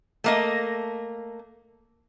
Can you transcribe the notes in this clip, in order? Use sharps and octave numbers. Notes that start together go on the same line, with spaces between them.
A3 A#3 D#5